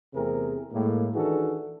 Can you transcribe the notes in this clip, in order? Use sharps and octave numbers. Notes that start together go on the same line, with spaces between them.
E2 C3 A3 C4 G#4 A#4
A2 G#3 A#3
D#3 E3 D4 F#4 G#4 A4